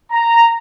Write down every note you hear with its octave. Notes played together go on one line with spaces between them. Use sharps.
A#5